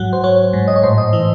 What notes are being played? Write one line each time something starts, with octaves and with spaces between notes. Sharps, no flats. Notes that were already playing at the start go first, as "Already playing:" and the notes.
Already playing: G#2 F#3 F#5
C5
F#3 C#5
G#2
D#5
C#5
A2 C5
D#5
E3